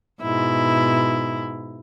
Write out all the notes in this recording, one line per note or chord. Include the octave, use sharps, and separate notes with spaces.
G#2 B2 E4